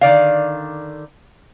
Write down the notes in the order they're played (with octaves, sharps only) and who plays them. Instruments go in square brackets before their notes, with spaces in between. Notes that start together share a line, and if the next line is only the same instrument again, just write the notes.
[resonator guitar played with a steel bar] D3 D#3 D5 F5